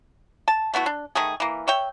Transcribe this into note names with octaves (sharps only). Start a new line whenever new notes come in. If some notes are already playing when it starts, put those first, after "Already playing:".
A5
A3 B3 E4 F#4
D4
D#3 A3 G#4
E3 A#3
C#5 E5 G5